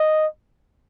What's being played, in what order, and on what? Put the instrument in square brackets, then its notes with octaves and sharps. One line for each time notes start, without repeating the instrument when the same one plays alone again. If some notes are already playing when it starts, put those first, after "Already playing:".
Already playing: [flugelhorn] D#5